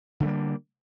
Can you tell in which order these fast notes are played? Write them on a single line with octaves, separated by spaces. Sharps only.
D3 A3 G3 A#3